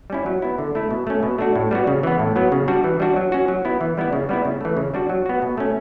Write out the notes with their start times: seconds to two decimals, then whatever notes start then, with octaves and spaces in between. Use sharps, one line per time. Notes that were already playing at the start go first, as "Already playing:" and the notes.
0.10 G3 C#4 E4
0.26 F#3
0.42 B3 E4
0.58 D3
0.75 A3 E4
0.91 B2
1.07 A3 C#4
1.23 B2
1.38 A3 D4 F#4
1.56 A2
1.71 G3 B3 F#4
1.87 C#3
2.03 E3 B3
2.19 A2
2.36 F#3 B3
2.52 C#3
2.68 G3 D4 F#4
2.84 E3
3.00 G3 D4 F#4
3.16 F#3
3.32 C#4 F#4
3.48 F#3
3.65 B3 E4
3.81 E3
3.97 G3 B3 E4
4.13 C#3
4.29 G3 B3 E4
4.45 C#3
4.61 E3 A3
4.77 C#3
4.94 G3 D4 F#4
5.09 F#3
5.26 B3 F#4
5.42 B2
5.57 A3 C#4